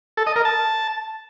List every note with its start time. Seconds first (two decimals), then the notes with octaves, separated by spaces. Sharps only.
0.17 A4
0.27 D#5
0.36 A#4
0.45 A5